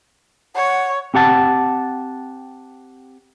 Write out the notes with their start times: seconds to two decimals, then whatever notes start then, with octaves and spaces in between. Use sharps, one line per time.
0.55 C#5 F#5
1.14 C4 G4 F#5 A5